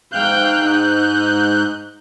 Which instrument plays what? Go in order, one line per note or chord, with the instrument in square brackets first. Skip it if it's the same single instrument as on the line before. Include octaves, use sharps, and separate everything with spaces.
[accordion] G#2 F#6 G6 [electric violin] F5 G5
[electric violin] D#4